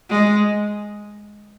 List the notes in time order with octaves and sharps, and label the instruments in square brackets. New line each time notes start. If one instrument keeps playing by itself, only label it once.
[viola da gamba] G#3